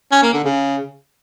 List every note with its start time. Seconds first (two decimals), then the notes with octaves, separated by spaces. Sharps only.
0.12 C#4
0.23 A#3
0.33 D3
0.44 C#3